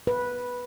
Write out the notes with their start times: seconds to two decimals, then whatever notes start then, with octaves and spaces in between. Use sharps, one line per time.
0.07 B4